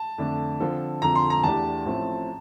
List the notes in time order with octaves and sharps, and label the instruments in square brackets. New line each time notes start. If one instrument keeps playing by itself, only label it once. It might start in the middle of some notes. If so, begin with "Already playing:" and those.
Already playing: [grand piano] A5
[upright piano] F2 D3 A3 D4
D3 F3 C4 F4 A4
[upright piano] F2 D3 F3 [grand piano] A#5
[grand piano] C6
A#5
[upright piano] E2 E3 A3 D4 G4 [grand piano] A5
[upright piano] A1 A2 F3 A3 C4